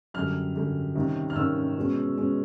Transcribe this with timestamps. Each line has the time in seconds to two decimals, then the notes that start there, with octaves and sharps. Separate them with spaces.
0.14 F#2 D3 G3 F6
0.55 F#2 D3 G3
0.95 C3 D#3 G3 A#3 C#4
1.30 F6
1.36 C3 D#3 G3 A#3 C#4 E6
1.77 B2 G#3 C#4
2.17 B2 G#3 C#4